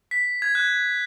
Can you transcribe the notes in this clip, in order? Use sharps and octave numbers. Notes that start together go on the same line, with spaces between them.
B6
G#6
F#6